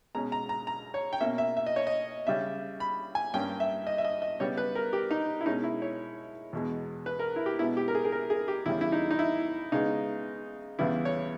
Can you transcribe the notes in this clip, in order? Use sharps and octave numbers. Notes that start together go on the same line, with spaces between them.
B2 G#3 C#4 A#5
A#5
A#5
A#5
C#5
G5
B2 A#3 C#4 E5
E5
E5
D#5
C#5
D#5
C#3 G3 C#4 E5
B5
G#5
G2 G3 A#3 C#4 G5
E5
D#5
E5
D#5
D#5
C#3 G3 B3 C#5
B4
A#4
G4
D#4
E4
B2 G#3 C#4 D#4
E4
C#5
E2 B2 G#3
B4
A#4
E4
G4
B2 G#3 B3 E4
G4
A#4
G#4
G#4
A#4
G#4
G4
E2 C#3 G3 C#4 E4
E4
D#4
D#4
E4
C#3 G#3 B3 D#4
E2 C#3 E3 G3 B3 E4
C#5